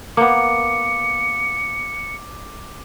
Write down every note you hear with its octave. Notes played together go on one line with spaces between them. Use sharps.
A#3 B3 D6 C#7